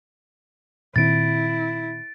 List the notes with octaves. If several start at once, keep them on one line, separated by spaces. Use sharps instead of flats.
A#2 D#3 C4 E4 A6 D7